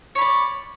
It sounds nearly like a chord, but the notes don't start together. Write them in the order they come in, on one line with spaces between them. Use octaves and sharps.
C#5 B5 D5